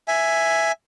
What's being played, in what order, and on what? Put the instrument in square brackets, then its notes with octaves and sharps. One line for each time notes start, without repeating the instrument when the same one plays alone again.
[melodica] E5 G#5